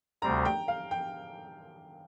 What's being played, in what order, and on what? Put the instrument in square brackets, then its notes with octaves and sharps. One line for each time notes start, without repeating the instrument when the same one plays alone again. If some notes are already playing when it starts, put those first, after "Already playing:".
[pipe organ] D2 C3 G3 C4 [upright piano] A#5
[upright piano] G5
F5
G5